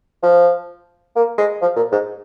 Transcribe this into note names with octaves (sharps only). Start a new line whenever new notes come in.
F3
A#3
G#3
F3
A#2
G#2